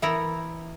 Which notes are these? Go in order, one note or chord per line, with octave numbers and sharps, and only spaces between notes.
E3 B3 E4 A#4 E5